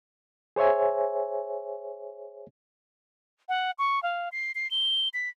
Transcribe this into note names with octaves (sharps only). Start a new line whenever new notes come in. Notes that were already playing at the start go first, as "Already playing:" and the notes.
G#4 C5 C#5 E5 G#5
F#5
C#6
F5
C7
C7
G7
B6